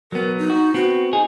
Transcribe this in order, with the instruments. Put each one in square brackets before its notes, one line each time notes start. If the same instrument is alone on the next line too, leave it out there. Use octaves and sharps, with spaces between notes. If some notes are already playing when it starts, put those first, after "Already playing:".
[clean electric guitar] F#3 B3 [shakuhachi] A#4
[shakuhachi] D#4
[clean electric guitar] F#4
[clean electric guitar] B3 C4 [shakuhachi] F#4
[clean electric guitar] D#4 G#4